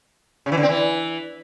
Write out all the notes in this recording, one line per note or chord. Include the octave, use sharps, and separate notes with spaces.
C#3
E3
D3
C4
E3